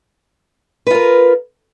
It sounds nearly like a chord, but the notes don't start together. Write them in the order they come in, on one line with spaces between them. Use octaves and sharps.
B4 F4 A#4